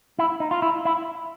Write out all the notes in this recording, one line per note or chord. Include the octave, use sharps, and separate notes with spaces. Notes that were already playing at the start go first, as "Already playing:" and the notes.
E4
D#4
F4
E4
E4